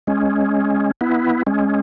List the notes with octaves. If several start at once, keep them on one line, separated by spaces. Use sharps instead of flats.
G#3 C#4
B3 E4
G#3 C#4